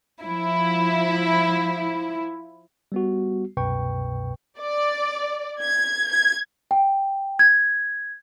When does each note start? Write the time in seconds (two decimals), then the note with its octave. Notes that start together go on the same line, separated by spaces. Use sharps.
0.22 F3 E4
2.92 G3 B3 F#4
3.57 C2 F#2 B2 B4 G5 C#6
4.59 D5
5.61 G#6
6.11 G#6
6.71 G5
7.39 G#6